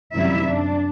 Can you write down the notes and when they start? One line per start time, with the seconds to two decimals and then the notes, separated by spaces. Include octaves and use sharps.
0.15 F#2 C3 D#3 G3 E4 E5
0.46 D4